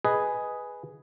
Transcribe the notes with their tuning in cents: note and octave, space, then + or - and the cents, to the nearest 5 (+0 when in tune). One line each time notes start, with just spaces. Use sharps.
G#4 +0 B4 +0 D#5 +0